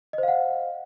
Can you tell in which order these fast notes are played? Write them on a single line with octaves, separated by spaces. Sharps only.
D#5 C5 F5 F#5